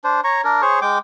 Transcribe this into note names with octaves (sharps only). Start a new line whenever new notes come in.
D4 C5
C#5 A#5 C#6
D4 A#4
G#4 C5 C#5 C#6
G#3 G5 D6